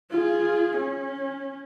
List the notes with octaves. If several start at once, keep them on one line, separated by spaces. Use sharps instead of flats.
F4 G#4
C#4